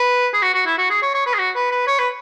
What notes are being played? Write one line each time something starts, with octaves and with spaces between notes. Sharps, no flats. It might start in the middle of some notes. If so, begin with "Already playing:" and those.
Already playing: B4
G#4
F#4
F#4
E4
F#4
G#4
C#5
C#5
B4
G#4
F#4
B4
B4
C#5
B4